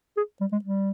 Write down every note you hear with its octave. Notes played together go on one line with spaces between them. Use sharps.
G#4
G3
G#3
G3